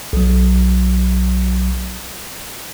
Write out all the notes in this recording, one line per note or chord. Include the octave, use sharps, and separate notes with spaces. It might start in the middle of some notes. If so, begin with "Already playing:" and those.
B1 F#3